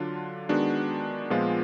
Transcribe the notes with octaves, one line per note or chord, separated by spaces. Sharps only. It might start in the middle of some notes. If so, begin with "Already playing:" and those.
Already playing: D3 F#3 D4 F4
D#3 G#3 B3 D4 F#4
A#2 F3 G#3 B3 F4